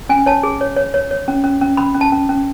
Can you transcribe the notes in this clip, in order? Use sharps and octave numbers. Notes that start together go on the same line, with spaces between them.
C#4 G#5
C#5 A5
G#4
C#5
C#5
C#5
C#5
C#4
C#4
C#4
C#4 B5
C#4
A5
C#4
C#4